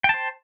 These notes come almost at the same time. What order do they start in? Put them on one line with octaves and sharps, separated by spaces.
G5 A5 C5